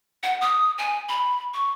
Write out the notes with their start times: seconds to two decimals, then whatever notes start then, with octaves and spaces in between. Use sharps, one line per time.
0.23 F#5
0.41 D#6
0.78 G#5
1.09 B5
1.54 C#6